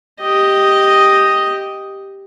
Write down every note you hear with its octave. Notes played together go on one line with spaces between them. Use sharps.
G4 D#5